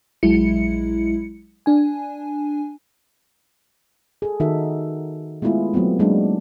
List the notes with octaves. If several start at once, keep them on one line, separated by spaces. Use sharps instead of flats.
A#1 F#3 G#3 E4 C#7
D4 G#5
G#4 A4
D#3 D#4 F#4 A4 A#4 E5
G#3 A3 B3 E4 F4 G#4
F#3 A3 B3 C4
F#3 G#3 A#3 D4 D#4